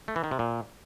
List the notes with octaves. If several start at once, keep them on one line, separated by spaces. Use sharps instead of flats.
A3
E3
D#3
C3
A#2